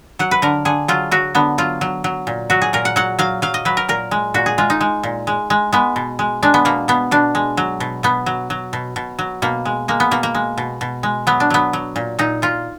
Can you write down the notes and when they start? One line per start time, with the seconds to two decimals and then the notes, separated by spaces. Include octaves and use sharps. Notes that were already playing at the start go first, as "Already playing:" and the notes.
0.19 F#3 F#5
0.31 B4
0.42 D3 A#4
0.65 D3 G#4
0.88 F#3 F4
1.11 F#3 F#4
1.35 D3 B3
1.58 F#3 F4
1.81 F#3
2.04 F#3
2.27 A#2
2.50 F#3 F#4
2.62 G#4
2.73 A#2 A#4
2.85 F#5
2.96 F#3 F#5
3.19 F#3 F5
3.42 F#3 F5
3.54 D#5
3.65 F#3 B4
3.77 A#4
3.89 A#2 A#4
4.11 G#3
4.34 A#2 F#4
4.46 G#4
4.58 G#3 F4
4.70 D#4
4.81 G#3
5.03 A#2
5.27 G#3
5.50 G#3
5.73 G#3 B3
5.96 B2
6.19 G#3
6.43 G#3 D4
6.54 B3
6.65 B2 A#3
6.88 B2 B3
7.11 B2 D4
7.35 G#3
7.57 F#3
7.80 B2
8.03 B2 B3
8.26 F#3
8.50 F#3
8.73 B2
8.96 B2
9.19 F#3
9.42 B2 A#3
9.65 G#3
9.88 G#3 A#3
10.00 B3
10.11 B2 A#3
10.23 A#3
10.35 G#3
10.58 B2
10.81 B2
11.03 G#3
11.27 F#3 B3
11.40 D4
11.50 F#3 B3
11.73 F#3
11.96 A#2
12.19 A#2 D#4
12.42 A#2 F4